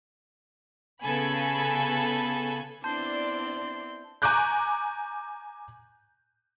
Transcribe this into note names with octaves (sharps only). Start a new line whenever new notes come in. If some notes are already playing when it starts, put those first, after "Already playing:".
C#3 B3 A4 G#5 B5
B3 C4 D4 E4 D5 A5 C6 G6
G#5 A#5 C#6 D6 F#6 G6